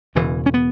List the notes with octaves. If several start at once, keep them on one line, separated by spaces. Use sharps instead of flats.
E1 E2 C#3 E3
C#4
B3